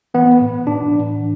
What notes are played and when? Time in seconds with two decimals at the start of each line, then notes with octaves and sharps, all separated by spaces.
0.14 E3 B3
0.41 A2
0.67 A2 D4
0.94 E3
1.19 E3